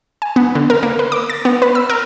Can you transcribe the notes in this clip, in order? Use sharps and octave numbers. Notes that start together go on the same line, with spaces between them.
G#5
B3
D3
A#4
A#3
B4
D6
A6
B3
B4
E6
A#4